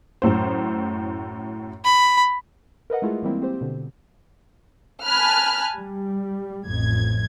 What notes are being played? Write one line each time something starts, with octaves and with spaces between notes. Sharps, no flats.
F#2 A2 C5
B5
A#4 B4 D#5 F#5
G#3 A3 E4 F4 G#4
E3 G3 G#3 A#3 C4 E4
C4 G4 C5
B2 D3
G#5 A5 B5 F6 F#6
G3
A1 F2 G#6